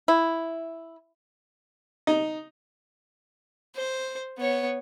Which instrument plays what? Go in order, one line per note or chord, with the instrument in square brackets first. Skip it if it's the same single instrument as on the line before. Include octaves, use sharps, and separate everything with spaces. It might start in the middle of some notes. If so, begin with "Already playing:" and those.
[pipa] E4
[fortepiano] D#4
[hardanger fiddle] C5
B3 C#5